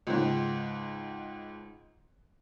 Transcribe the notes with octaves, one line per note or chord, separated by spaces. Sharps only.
C#2 G#2